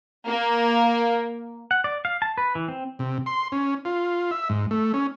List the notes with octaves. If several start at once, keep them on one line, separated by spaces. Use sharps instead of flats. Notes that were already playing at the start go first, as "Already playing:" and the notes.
A#3
F#5
D5
F5
A5
B4
E3
C4
C3
C6
C#4
F4
E5
G#2
A3
C#4